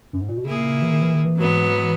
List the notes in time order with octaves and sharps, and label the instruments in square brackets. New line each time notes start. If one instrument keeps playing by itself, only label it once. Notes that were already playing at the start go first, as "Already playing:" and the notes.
[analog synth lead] F#2
G#2
A#2
B2
[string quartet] A#2 A#3 E4 G#4 [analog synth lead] C#3
[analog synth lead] E3
D#3
E3
D#3
E3
[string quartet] G#2 F#3 B3